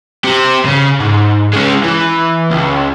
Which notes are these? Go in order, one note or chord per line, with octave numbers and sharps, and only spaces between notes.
C4 G4
C#3
G#2
G#3 C#4
E3
C#2